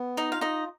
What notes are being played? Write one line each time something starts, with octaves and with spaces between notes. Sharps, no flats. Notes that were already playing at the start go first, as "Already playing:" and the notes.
Already playing: B3
D#4 D#5
F4 F5
D#4 D#5